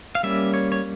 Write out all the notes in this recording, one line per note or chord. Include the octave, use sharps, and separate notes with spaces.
F5
G3 A#3 C#4 E5
C#5
C#5